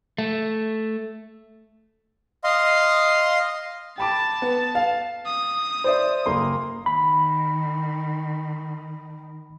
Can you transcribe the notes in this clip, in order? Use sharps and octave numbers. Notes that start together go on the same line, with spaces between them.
A3
D#5 F5 C6
G5 A5 B5 D6
B3
F5
D#6
C5 D5 E5
F#1 A#3 C6
D#3 B5